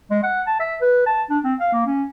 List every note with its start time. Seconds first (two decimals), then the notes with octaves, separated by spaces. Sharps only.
0.11 G#3
0.23 F#5
0.47 A5
0.60 E5
0.81 B4
1.06 A5
1.30 D4
1.44 C4
1.60 F5
1.73 A#3
1.86 C#4